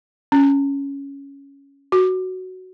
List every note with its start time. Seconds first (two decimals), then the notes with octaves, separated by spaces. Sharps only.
0.32 C#4
1.92 F#4